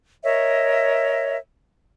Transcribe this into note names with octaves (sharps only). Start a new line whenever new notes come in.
A#4 C#5 D#5 E5